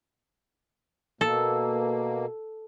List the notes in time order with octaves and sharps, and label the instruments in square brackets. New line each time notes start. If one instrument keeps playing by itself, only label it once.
[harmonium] B2 A#3 [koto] A4